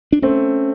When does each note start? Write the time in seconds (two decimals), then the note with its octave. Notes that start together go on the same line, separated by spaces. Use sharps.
0.12 D4
0.22 A3 C4 C#4